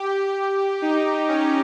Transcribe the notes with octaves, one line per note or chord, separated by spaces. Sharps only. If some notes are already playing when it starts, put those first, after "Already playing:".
Already playing: G4
D#4
C#4